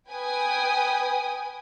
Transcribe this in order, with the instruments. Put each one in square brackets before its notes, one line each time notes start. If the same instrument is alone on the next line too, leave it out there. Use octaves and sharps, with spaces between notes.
[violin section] B4 G5 G#5 D#6